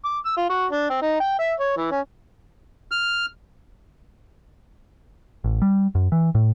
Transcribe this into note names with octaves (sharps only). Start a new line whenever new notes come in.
D6
E6
F4
F#4
D4
C4
D#4
G5
E5
C#5
E3
C#4
F6
A1
G3
F#2
E3
A2